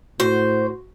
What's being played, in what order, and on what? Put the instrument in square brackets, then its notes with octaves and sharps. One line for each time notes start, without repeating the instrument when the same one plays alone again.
[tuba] A2 [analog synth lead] F#4 [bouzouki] C5